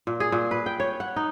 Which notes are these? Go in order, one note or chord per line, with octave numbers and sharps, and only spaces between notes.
A#2
G#4
A#2
B4
G5
C#5
F#5
D#4